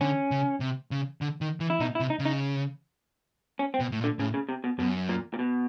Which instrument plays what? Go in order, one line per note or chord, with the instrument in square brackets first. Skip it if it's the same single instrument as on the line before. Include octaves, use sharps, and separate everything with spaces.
[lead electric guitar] D3 [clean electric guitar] C#4
[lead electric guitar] C#3
C3
C#3
D3
D#3
E3
[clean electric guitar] E4
[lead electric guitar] B2 [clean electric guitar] D#4
[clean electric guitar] E4
[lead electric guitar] C3
[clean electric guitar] D#4
[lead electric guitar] C#3
[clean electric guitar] D#4
C#4
C4
[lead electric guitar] B2
A2
A#2
[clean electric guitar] D3
[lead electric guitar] A2 [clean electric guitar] C#3
[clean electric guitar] C#3
C3
B2
[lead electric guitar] F#2 [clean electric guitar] B2
[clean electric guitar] A#2
A#2
B2